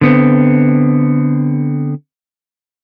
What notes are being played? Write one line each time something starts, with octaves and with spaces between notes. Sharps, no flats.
D3 B3 C4